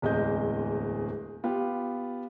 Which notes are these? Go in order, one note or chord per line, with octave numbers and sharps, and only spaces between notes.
D1 E2 G#3 C4 D#5 G6
B3 F4 G4